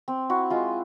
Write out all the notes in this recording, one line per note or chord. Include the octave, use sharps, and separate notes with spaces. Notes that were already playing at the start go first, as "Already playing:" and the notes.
C4
E4 F#4
G#3 F4